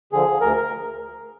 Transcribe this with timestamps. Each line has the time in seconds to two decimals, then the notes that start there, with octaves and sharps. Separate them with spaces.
0.12 D3 F3 G#4
0.41 D2 A#4
0.57 A#4